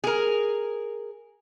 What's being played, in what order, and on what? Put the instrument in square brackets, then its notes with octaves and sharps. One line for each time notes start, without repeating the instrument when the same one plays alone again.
[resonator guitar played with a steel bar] G#4 A#4